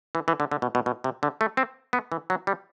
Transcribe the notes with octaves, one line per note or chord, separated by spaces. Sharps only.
E3
E3
D3
D3
B2
B2
B2
C3
D3
A3
C4
B3
E3
F#3
G3